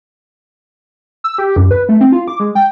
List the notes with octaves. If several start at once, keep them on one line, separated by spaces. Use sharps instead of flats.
E6
G4
F#2
B4
A3
C4
F4
D6
G#3
G5